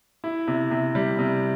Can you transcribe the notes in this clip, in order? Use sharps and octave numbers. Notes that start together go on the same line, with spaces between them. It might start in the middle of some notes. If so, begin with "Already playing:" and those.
E4
C3
C3
G3
C3